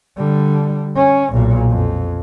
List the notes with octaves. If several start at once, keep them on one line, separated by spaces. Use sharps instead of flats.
D3 G3
C#4
B1 A#2
F2